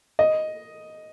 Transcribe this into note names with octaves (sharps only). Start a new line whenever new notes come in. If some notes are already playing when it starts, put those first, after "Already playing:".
D#5